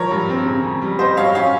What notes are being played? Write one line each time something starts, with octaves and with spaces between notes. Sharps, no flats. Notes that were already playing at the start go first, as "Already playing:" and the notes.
Already playing: F3 A#4 C#5
G2
C4
C#3
F2
G3
G3 C5 D#5
G2 C#5 F5
C#4 C#5 F5